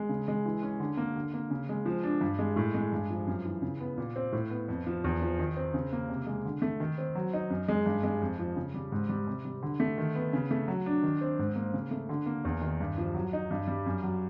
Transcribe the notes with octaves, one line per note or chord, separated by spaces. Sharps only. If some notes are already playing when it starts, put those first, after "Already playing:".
Already playing: G#3
C#3
G#3
E3
C#4
D3
A#3
D3
A#3
C#3
G#3
F3
D4
G2
G#3
A2
G#3
G2
F3
F#2
E3
C#3
B3
A#2
C4
A2
B3
F2
F3
E2
F3
D#3
C4
C#3
A#3
C3
G#3
D3
A3
D#3
C4
F#3
D#4
F#2
G#3
G2
G#3
F2
F3
C#3
G3
G#2
G3
C3
G3
D3
A3
D#3
B3
C#3
A3
F#3
D4
D#3
C4
G#2
A#3
C#3
A3
D3
A#3
E2
D#3
G2
F3
F#3
D#4
G2
G3
F#2
F#3